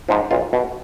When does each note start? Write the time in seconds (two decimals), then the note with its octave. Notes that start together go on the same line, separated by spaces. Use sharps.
0.09 G#2 F3
0.31 B1 F4
0.53 B2